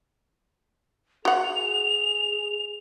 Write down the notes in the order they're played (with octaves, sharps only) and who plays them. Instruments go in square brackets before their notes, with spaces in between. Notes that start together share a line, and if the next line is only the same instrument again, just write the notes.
[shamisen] F#4 F#5 [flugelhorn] G#4 [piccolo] F7